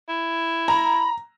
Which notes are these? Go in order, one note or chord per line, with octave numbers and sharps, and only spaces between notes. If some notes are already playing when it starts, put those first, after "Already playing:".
E4
A#5 B5